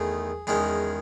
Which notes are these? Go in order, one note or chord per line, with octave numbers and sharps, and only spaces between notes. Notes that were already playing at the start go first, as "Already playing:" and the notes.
Already playing: E2 D#3 A3 G#4
E2 D#3 G#3 C#4 G#4